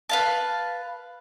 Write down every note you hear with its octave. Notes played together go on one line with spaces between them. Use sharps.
B4 F5 A5